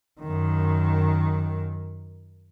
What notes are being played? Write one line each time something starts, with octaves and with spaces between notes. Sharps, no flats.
F#2 D#3